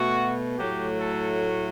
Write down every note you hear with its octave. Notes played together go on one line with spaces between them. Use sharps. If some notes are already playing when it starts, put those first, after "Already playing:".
Already playing: B2 A3 F#4
A2 F#3 A3 G4
A4